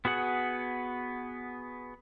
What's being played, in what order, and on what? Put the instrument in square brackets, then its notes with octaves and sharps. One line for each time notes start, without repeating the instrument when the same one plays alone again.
[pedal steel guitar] B3 F#4 G#4 F#5